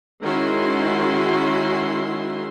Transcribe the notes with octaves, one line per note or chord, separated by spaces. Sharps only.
D#3 G#3 C#4 E4 F#4 C6